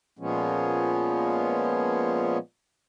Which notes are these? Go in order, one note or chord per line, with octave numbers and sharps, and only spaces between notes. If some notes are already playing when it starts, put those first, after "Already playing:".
A#2 F3 G#3 B3 C#4